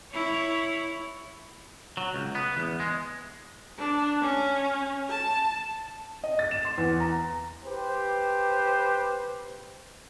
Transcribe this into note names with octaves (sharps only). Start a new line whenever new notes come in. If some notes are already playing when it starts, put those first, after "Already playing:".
E4 C#5
F#3
C#2
B3
E2
G#3
D4
C#4
A5
D#5
A6
E7
C6
E2
A#5
G4 B4 C5